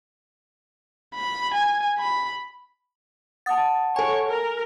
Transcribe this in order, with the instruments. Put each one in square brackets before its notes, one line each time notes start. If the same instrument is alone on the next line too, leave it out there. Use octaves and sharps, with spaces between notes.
[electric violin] B5
G#5
B5
[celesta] F#5 A5 [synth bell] D#6 A6
[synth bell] A4 G#5 [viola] C#5
[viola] A#4